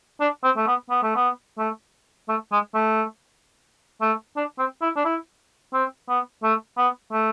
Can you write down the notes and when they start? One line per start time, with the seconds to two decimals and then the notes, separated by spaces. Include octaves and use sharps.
0.21 D4
0.44 C4
0.57 A3
0.67 B3
0.90 B3
1.03 A3
1.16 B3
1.58 A3
2.29 A3
2.52 G#3
2.75 A3
4.02 A3
4.36 D4
4.58 C4
4.82 E4
4.96 D4
5.05 E4
5.74 C4
6.09 B3
6.43 A3
6.77 B3
7.12 A3